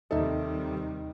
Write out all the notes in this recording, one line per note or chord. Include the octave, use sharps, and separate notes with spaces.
D#2 C3 D#3 G3 D#4 A4 D#5 E5